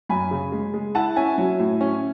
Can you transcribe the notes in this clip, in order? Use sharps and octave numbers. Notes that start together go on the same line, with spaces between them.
F#2 G#5 B5
C#3
G#3
G#3
E4 F#5 A5
C#4 E5 G#5
F#3
A2
C#4